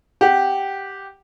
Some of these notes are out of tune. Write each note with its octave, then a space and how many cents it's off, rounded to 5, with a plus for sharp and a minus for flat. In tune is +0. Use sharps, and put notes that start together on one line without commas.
G4 +0 F#5 +15